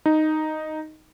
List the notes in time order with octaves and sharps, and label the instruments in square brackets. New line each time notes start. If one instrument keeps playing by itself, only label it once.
[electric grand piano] D#4